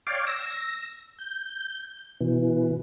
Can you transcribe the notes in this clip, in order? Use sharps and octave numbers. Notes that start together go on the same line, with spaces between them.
C#5 D5 F5 G5
E6 A#6
G6
B2 E3